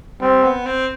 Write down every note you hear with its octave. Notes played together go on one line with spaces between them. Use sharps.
G3 C4
B3
C4